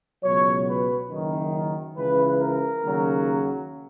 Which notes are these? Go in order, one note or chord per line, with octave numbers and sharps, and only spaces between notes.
C#2 B2 F#3 C#5
B4
F#1 F#2 D#3
C#2 C#3 E3 B4
A#4
D#2 C#3 F#3